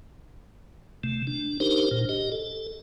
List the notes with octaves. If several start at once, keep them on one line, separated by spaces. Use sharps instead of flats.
C3 A3
D4
D4 D#4 G4 A#4 C5
A#2
G4 D#5
A4